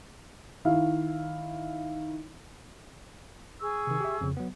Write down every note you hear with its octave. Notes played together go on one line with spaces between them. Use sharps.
D#3 E4 F5
G#4 C#6 E6
C3 D#3
G4 E5
F2 C#3
F#3 B3